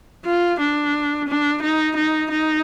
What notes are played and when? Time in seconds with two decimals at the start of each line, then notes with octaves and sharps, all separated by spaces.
0.25 F4
0.60 D4
1.28 D4
1.62 D#4
1.96 D#4
2.31 D#4